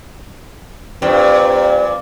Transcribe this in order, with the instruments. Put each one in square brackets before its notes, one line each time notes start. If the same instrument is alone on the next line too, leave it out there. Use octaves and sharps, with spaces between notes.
[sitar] G2 A#2 [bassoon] C4